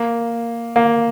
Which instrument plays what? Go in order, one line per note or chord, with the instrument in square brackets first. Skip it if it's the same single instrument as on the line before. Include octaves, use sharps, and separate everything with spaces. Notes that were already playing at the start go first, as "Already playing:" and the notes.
Already playing: [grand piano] A#3
A#3